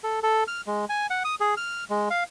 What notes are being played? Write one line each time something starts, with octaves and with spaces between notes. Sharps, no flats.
A4
A4
F6
G#3
G#5
F#5
D#6
G#4
F6
G#3
F5